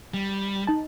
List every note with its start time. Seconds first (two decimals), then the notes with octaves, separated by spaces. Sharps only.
0.14 G3
0.67 D#4 A5